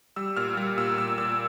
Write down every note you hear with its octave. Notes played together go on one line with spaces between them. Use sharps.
G3 E6
A#2 F6
G3 F6
A#2 E6
A#2 E6
A#2 E6